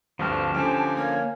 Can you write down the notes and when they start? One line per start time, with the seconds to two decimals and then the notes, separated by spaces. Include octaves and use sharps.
0.19 D2 G2 F3 C4 A5 F6
0.54 D3 F3 C#4 G4 G#5
0.97 A#3 C#5